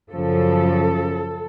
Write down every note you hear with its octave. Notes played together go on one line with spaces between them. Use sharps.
F#2 C#3 F3 A4